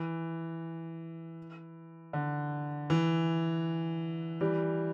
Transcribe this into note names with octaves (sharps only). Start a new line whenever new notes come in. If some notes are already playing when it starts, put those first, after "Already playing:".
Already playing: E3
D3
E3
E3 G3